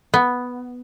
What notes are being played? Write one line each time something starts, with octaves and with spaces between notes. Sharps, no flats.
B3